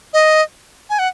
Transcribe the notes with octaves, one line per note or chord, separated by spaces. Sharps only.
D#5
G#5
F#5